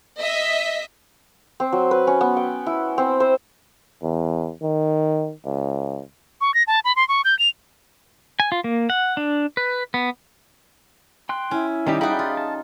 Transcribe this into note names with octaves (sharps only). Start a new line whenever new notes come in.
D#5 E5 B6
C4
F#3
B4
C#4
B3
G5
E4
C4
C5
E2
D#3
C#2
C#6
A#6
A5
B5
C6
C#6
G6
F7
G#5
F4
A#3
F#5
D4
B4
B3
G5 C6 F#6
C#4 E4
D#3 G3 C#4 D#4 G4 D#5
D#4 F#4 G#4 D5 E5 F5 G5 B5
F4
A5